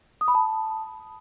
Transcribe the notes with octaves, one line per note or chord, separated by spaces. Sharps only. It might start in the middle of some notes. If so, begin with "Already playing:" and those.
D#6
B5
A5